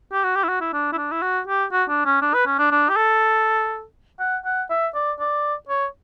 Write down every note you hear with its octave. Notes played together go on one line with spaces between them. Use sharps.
G4
F#4
G4
E4
F#4
E4
D4
E4
D4
E4
F#4
G4
F#4
D4
C#4
D4
B4
C#4
D4
D4
G4
A4
F#5
F#5
E5
D5
D5
C#5